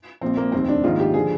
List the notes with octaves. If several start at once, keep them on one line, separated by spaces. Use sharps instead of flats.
A#1 A#2 F3 C4
A#3
F1 D#2 D#3 C4
D4
A#1 G#2 D#3 F4
G4
D3 F3 G#4